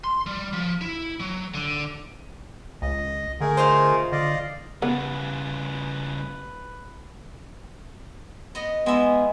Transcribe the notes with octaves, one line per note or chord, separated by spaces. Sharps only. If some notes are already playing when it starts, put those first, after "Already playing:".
C6
G3
F3
E4
F#3
D3
C#2 D#5
D3 A3 G#4 A#4
D#4 F4 C5
D3 D5 D#5 F5
C#3 G3 B3 B4
B3 D#5
G#3 B3 E4 E5